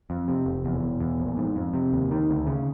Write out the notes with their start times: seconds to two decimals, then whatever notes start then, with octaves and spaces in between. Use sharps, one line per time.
0.10 F2
0.28 C3
0.46 F1
0.65 E2
0.82 E1
1.01 E2
1.20 A#1
1.37 G#2
1.56 F2
1.74 C3
1.93 D#2
2.11 D#3
2.30 D2
2.47 C#3